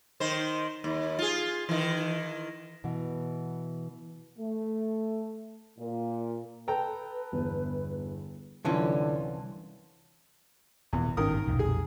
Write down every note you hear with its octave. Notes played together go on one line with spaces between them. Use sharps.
D#3 C5
D#2
F4 G#4
D#3 E3
B2 E3
A3
A#2
A4 B4 G5 A#5
G1 E2
C2 F#2 D3 E3 C#4 F4 A5 C6
D#1 E2
G#1 G2 D#3 C#4 A#4 D#6
B1 F2 A#2
G#4